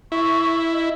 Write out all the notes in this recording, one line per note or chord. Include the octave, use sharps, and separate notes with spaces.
E4 C#6
D#5